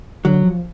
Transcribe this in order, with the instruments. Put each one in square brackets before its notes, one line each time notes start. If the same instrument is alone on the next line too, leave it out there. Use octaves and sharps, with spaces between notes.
[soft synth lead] D3 [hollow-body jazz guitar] F#3
[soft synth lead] F3